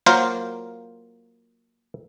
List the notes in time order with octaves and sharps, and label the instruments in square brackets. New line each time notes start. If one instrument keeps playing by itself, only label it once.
[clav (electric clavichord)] F#3 A#3 F4 A#4 C5 F5